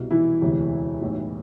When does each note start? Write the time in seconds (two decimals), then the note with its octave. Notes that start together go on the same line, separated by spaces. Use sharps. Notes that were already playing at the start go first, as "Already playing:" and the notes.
Already playing: C2 B2
0.11 E3 E4
0.41 E1 D2 C3 E3
1.02 B1 A2 E3